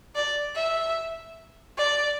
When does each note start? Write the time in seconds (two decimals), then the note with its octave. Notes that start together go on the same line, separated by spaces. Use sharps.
0.15 D5
0.56 E5
1.77 D5